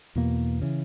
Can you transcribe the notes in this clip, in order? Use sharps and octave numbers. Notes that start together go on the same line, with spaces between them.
E2 B2 A#3
C#3 E3